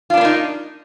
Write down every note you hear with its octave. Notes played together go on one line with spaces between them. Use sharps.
A#3 B3 D4 D#4 F4